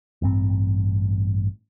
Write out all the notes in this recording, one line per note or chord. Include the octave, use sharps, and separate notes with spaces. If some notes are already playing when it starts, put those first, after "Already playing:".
A1 G2 C4